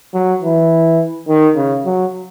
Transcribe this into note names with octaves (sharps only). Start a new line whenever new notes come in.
F#3
E3
D#3
C#3
F#3